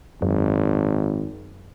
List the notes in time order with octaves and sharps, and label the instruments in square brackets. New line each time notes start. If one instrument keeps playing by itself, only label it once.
[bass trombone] G#1 [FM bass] F#2